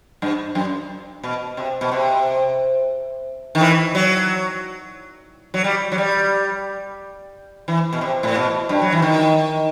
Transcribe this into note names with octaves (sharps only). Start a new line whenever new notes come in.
G2
F#2
B2
C3
B2
C3
D#3
E3
F#3
F#3
G3
F#3
G3
E3
B2
C3
A2
B2
G2
F#3
E3
D#3